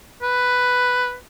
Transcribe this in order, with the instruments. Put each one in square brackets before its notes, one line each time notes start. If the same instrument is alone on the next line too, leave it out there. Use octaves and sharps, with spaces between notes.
[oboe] B4